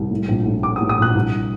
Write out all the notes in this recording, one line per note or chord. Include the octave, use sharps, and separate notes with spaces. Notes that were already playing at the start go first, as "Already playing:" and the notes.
Already playing: C2
A2
A#1
A2
A2 D6
D#6
A2
D#6
A#1 F#6
C2